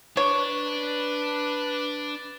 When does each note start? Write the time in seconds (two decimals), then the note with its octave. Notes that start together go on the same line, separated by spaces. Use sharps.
0.17 D4 B4 C#5 D5